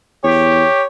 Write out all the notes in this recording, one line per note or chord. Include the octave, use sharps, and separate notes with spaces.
E2 G4 C#5